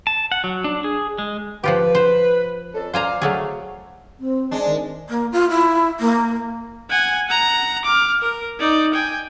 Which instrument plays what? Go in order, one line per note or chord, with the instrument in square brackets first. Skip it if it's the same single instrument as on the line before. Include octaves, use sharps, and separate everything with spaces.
[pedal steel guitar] A5
F#5
F#3
D4
G#4
G#3
[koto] F3 F4 G4 [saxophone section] B4
[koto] C5
[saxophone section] F2 C#4 A4
[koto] C5 G#5 A#5 [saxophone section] D5 F5
[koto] F#3 A3 G#4
[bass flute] C4
[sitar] G#3 D4
[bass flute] D#3
[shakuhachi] A#3
F4
E4
A#3
[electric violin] F#5 G#5
F#5 A#5
D6 F6
A#4
D#4 D5
G5 G#5